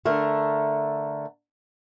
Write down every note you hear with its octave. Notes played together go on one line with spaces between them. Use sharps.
D3 A3 A#4